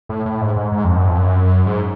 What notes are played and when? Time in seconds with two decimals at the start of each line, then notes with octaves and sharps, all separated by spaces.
0.09 A2
0.26 A2
0.41 G#2
0.56 G#2
0.72 G#2
0.84 F2
0.96 F#2
1.07 F2
1.18 F#2
1.66 G#2